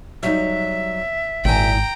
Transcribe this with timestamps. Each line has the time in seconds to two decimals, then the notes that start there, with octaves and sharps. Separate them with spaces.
0.23 F#3 G3 D#4 E5
1.45 G#1 A#2 E4 G5 G#5 A#5